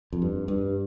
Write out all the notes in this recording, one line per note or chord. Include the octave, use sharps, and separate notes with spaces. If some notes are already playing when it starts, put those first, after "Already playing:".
F2
G2
G2